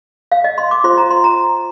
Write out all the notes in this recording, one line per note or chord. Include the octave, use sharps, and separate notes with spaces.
F5
D#5
C6
D6
F4 C5 C6
A#5
C6
A#5